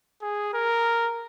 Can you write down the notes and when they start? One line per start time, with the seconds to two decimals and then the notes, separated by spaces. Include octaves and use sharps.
0.22 G#4
0.53 A#4